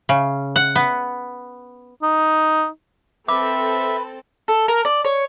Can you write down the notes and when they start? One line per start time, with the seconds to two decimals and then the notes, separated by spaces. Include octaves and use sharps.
0.09 C#3
0.56 F#5
0.76 B3
2.03 D#4
3.28 C4 A4 B4 E5 D6
4.48 A4
4.68 A#4
4.85 D5
5.05 C#5